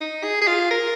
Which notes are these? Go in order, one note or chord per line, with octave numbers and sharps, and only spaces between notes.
D#4
G#4
G#4
F4
A#4